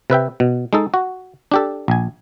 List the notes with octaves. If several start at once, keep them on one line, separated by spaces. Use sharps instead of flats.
C3 B4 E5 G5
B2
G#3 D#4 A4
F#4
D4 G4 A4
A#1 G#5